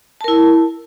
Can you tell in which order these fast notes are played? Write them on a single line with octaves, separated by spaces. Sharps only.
A5 A#4 E4